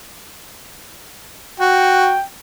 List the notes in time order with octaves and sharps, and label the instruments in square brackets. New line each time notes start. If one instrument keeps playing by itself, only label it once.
[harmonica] F#4 [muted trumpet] G5